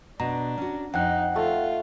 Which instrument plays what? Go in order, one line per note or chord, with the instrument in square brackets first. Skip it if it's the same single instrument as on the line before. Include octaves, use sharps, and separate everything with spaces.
[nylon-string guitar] B2 [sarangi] D4 [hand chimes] A#5
[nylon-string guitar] C#4 F#4
[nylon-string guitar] F2 [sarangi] D#4 [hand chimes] F#5 G5 F#6
[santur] A3 [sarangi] F4